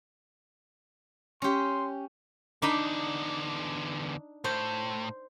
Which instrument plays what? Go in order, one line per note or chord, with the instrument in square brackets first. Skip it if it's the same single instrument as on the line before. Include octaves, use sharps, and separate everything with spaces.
[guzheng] C#4 G4 [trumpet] C6
[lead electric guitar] E2 D3 [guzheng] D4 D#4 B5
[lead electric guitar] A2 [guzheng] C5